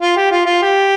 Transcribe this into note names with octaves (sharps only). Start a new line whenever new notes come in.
F4
G4
F4
F4
G4